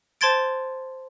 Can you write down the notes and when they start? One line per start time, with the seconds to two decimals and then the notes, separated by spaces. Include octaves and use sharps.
0.21 C5 A5 C6 G#6 A6 D7